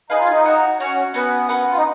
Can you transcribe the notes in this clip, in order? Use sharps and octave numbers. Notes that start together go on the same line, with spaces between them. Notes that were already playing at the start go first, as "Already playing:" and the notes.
D#4 G#4 B4 F5 G#5
F4
D#4
F#4 C#5 F#5
C#4 F#4 C#5 F#5
B3 C#4 F#4 B4 F#5
C#4 F#4 B4 F#5
F4
D#4